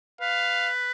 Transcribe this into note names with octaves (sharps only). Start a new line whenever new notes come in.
B4 F5